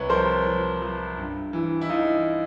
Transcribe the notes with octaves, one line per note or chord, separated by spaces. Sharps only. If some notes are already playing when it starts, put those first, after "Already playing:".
Already playing: C2 B4 C#5
F3 A#4 C5
F3
F3
G2
E3
E4
E3 D#4 F4